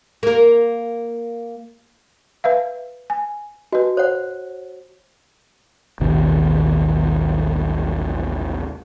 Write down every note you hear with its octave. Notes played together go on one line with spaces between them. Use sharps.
A#3 A#4
B4 E5 F5
G#5
F#4 B4 D#5
C5 C#5 F#5
A1 D#2 B2 D#3